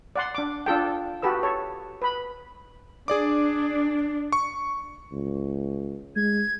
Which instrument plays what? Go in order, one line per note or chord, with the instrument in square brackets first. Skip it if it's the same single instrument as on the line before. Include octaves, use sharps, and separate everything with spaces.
[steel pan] D5 F#5 C6
D4 D6
D4 F4 A4 G5
F#4 G4 A4 B4 E6
A4 C#5
B4 B5
[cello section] D4 [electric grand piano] G#4 D5 D6
[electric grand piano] C#6
[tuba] C#2
[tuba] G#3 [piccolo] G#6